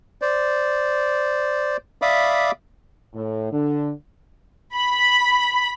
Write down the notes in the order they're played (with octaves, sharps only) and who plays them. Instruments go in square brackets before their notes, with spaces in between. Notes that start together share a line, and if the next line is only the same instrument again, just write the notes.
[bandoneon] C5 D5
D5 E5 F5 B5 D6 D#6
[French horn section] A2
D3
[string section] B5